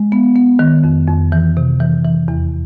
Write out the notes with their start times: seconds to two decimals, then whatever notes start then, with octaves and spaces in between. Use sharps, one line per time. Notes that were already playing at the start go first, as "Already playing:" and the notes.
Already playing: G#3
0.12 B3
0.36 B3
0.59 D#3
0.84 F2
1.08 F2
1.32 E3
1.57 C3
1.80 E3
2.05 E3
2.28 E2